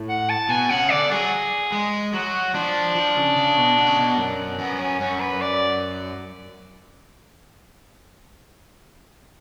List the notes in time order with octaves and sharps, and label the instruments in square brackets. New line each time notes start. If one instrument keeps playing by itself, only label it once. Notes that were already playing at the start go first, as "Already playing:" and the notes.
Already playing: [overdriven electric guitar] A2
[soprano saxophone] F#5
A5
[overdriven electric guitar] B2 [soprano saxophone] G#5
[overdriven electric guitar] C#3 [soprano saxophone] F#5
[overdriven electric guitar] D3 [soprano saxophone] D5
[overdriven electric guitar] F#3 [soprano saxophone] G#4
[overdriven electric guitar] G#3
[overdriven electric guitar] F#3 [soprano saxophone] F#4
[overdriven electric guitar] F3 [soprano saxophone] D4
[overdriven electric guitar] F3
C#3
C#3
B2
B2
C#3
B2
F#2
[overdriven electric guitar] F#2 [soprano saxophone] B3
[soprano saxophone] C#4
[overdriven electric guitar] F#2 [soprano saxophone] C#4
[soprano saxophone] B4
D5